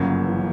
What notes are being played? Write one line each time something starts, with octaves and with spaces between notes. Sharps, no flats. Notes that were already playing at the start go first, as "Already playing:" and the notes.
Already playing: G1 F#2 C#3 F#3 A#3
E3